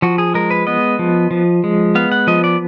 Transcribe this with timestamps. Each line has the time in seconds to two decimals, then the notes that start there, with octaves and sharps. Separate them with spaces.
0.02 F3 F#4
0.18 G#4
0.34 G#3 A#4
0.51 B4
0.67 B3 D#5
0.99 F3
1.31 F3
1.64 G#3
1.95 B3 F5
2.12 F#5
2.27 F3 D#5
2.44 D5